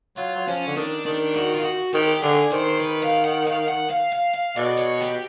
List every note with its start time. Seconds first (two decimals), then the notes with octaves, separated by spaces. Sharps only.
0.17 F#3 F4
0.35 F#3
0.47 F3 C#4
0.67 D3
0.76 D#3 D4
1.05 D#3 D4
1.35 F#4
1.54 F4
1.64 F#4
1.94 D#3 G4
2.23 D3 G#4
2.52 D#3 C5
2.80 B4
3.03 F5
3.24 F#5
3.47 F5
3.68 F#5
3.91 F5
4.13 F5
4.35 F5
4.57 B2 D5
4.78 C#5
5.00 G4